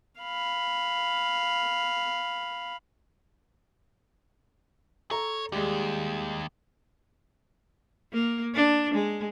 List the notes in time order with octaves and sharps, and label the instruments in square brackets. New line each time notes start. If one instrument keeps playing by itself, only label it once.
[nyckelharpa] F5 B5
[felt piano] A4 A#5 [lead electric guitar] C#5
[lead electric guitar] D#2 [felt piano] G3 G#3
[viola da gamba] A#3
D4
G#3